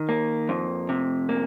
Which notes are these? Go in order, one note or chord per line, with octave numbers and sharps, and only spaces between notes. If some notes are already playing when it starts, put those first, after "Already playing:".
Already playing: D#3
A#3
F2
C3
A#3